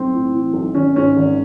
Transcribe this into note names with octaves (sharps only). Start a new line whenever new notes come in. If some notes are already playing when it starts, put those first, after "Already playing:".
Already playing: B1 C4
A2
E3
B1
G#1 C#4
G#2 C#4
G#1